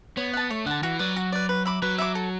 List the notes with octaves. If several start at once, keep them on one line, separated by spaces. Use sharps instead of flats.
B3 C#5
F#5 A5
A3 C#5
D3 F#5 A5
E3 F#4
F#3 B4 D5
F#4
B4 D5
B4
E5 B5 D6
F#3 B4
E5 B5 D6
A4